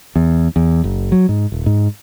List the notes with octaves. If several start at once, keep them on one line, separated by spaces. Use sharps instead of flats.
E2
E2
F#1
F#3
G#2
D#1
G#2